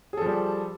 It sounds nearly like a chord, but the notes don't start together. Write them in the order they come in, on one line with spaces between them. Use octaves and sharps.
G#4 A4 F3 G3